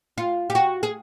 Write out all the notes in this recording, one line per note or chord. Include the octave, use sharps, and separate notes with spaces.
F4
G4
F#4
G#4